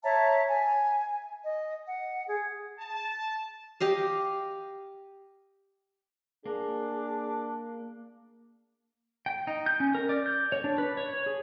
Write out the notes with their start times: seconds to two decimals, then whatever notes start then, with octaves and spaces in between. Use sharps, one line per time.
0.03 C#5 E5 A5 A#5
0.47 G#5
1.44 D#5
1.86 F#5
2.27 G#4
2.79 A5
3.80 G4 D#5 F5
6.46 A#3 D4 G#4
9.26 G5
9.47 D#4
9.66 G6
9.80 C#4
9.95 A#4
10.09 D5
10.26 G6
10.52 C#5
10.64 D4
10.78 B4
10.97 C#5
11.26 G#4